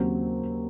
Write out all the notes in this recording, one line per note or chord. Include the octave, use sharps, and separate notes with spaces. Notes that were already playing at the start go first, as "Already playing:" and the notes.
Already playing: D#2 C#3 F#3 C4